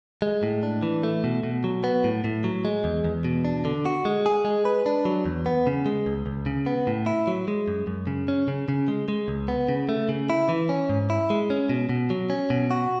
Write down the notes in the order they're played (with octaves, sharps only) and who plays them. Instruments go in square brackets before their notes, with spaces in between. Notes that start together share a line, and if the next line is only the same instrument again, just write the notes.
[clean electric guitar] G#3
A2
D4
E3
A3
B2
B2
F#3
B3
A2
A2
F#3
G#3
E2
E2
B2
D4
D3
F#4
G#3
G#4
G#3
B4
D4
F#3
E2
B3
C#3
G#3
C#2
C#2
C#3
B3
A2
E4
F#3
G#3
F#2
F#2
C#3
C#4
C#3
C#3
G#3
G#3
C#2
B3
C#3
A3
C#3
E4
E3
C#4
G#2
E4
G#3
C#4
B2
B2
F#3
C#4
B2
F#4